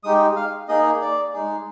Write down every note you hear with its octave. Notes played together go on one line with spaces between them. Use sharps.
G#3 D#4 G4 D#6
F5
A#3 D#4 G#4 D#5
D5
G#3 D#4 G#4